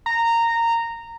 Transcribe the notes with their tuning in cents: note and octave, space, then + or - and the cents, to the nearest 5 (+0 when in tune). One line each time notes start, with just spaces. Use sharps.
A#5 -15